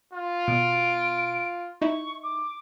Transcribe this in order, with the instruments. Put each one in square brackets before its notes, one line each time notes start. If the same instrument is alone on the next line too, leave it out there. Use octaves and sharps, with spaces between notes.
[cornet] F4
[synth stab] B2 [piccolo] D7
[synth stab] D#4 E4 [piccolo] C#6
[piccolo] D6